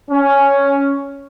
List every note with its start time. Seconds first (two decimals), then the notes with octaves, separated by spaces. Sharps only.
0.11 C#4